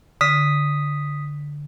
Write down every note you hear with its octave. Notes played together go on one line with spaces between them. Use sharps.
D3 D#6 B6